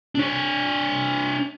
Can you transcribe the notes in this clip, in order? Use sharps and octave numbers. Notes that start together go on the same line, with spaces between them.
D4 C#5